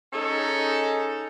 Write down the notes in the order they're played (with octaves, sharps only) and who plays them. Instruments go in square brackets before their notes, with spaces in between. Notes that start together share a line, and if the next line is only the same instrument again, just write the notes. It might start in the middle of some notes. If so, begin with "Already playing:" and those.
[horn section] C#4 D#4 G#4 A4